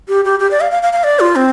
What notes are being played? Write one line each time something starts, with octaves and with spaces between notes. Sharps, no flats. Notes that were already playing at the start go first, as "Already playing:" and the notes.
G4
G4
G4
D5
F5
F5
F5
F5
D5
F4
C4